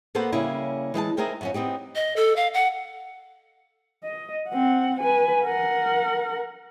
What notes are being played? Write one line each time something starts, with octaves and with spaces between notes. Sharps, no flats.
A#3 B3 F#4 A4 B4 C5
C#3 G3 A#3 C#4 E4
E3 G#3 G5 A5
D#4 E4 G#4 A#4 C5 G5
F#2 F3 C#4
B3 C4 D#4 G4
D#5
A4
F5
F#5
D#5
C4 F#5
B4 G#5
A#4 F#5